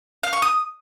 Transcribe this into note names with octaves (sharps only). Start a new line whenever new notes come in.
F5
C#6
D#6